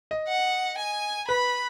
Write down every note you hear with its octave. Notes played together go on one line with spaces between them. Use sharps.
D#5
F#5
G#5
B4 B5